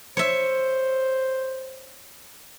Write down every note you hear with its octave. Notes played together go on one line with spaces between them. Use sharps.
C5 C#5 E5